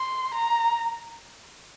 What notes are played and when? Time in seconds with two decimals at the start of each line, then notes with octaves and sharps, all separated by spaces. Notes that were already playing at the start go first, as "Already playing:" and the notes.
Already playing: C6
0.34 A#5